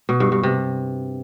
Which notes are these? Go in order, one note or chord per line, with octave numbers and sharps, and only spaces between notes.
B2
G2
G2
C3